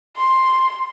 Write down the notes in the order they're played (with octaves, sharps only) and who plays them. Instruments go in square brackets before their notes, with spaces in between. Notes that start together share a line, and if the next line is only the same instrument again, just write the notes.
[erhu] C6